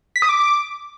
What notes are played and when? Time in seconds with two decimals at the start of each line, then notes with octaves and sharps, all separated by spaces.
0.16 B6
0.22 D#6
0.29 D6